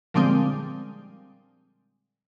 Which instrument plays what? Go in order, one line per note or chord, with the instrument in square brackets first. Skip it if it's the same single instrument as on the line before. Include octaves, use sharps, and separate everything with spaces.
[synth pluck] A#2 D3 F3 G3 G#3 C4